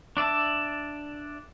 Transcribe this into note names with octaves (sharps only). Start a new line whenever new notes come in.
D4 D5 E5 A5